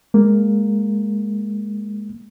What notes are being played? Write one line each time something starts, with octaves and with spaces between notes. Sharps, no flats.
G#3 A#3